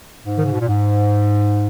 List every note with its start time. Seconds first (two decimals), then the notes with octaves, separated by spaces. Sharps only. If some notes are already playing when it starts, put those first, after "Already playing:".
0.25 G#2
0.37 D#3
0.44 C#3
0.52 B2
0.60 A#2
0.68 G#2